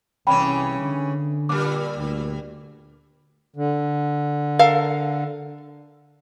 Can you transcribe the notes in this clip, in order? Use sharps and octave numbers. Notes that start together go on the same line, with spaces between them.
C2 C#3 E3 C#4 G5 B5
D3
A#2 G3 D6
D2
D3
A4 A#4 F5